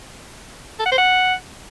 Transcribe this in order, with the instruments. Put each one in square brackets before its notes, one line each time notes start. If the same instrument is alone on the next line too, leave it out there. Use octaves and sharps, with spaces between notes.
[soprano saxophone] A4
F#5
C5
F#5